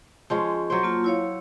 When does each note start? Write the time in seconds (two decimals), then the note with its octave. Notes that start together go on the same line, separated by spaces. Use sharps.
0.30 F3 G#3 C#4
0.70 F#3 C5
0.83 A#3 F4 A5
1.04 E4 C#5 F5